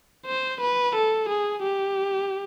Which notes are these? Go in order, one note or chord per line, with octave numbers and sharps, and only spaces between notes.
C5
B4
A4
G#4
G4